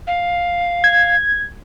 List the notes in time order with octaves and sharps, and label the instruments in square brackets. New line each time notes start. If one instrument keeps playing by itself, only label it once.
[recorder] F5
[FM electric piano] G#6